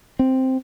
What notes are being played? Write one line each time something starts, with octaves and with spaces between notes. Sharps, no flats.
C4